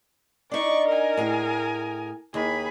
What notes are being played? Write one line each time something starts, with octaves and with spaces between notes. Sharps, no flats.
D4 D#4 D5 C#6
A#4 G#5
A2 G#4
D#2 G#4 B5